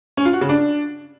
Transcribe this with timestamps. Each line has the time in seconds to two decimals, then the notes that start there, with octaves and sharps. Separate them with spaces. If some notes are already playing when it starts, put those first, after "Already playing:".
0.17 C#4
0.25 F4
0.33 F#4
0.41 C#3
0.49 D4